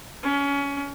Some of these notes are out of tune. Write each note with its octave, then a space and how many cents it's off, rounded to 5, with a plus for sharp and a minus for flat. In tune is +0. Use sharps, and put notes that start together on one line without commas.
C#4 +25